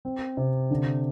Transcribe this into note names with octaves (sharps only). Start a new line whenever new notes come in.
C4
C3
D3